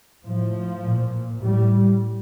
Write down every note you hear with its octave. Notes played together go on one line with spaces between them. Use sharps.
A2 F3
A#2
A2 G3